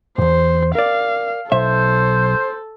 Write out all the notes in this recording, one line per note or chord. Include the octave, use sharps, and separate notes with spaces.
E2 G#2 C5
A#4 D5 F5
B1 A4 C5 E5